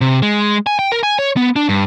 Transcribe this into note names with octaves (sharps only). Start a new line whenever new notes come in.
C3
G#3
G#5
G5
A#4
G#5
C#5
B3
D4
G2